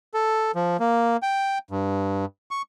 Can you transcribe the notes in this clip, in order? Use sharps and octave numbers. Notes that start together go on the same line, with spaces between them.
A4
F3
A#3
G5
G2
C#6